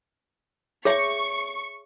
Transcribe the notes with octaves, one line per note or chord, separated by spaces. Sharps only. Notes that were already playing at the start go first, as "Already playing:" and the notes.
G#4 C#5 E5 C#6